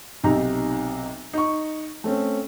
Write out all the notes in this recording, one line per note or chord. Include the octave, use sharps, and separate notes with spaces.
B1 C3 D#4 A#5
D#4 C#6
A3 C4 C#4